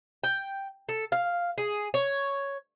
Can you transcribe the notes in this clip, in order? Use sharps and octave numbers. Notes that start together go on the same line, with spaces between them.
G5
A4
F5
G#4
C#5